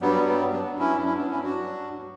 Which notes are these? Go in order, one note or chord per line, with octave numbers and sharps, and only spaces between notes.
G2 F#3 G3 B3
G3 B3
G2 F#3 B3 D4
C#4 E4
D4
G2 F#3 C#4 E4
B3 D4
C#4 E4
D4 F#4
G2 F#3